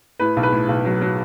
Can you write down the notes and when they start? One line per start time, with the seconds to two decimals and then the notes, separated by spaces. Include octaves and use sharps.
0.19 A2 B4
0.36 B1
0.43 B4
0.52 A2
0.68 B1
0.85 F#3
1.01 F#3